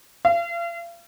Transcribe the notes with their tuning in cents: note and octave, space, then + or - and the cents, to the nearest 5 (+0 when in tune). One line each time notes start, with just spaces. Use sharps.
F5 -40